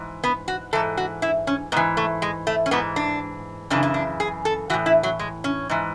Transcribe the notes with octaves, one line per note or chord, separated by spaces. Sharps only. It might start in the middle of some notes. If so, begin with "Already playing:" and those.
Already playing: G#2 E3
B3
F#4
G#2 E3 A4
F#4
E4
C#4
G#2 E3 B3
A3
G#3
A3
C#4
G#2 E3 B3
D4
F#2 C#3 E3 D4
E4
D4
G#4
A4
A2 E3 F#4
E4
F#3
G#3
C#4
G#2 E3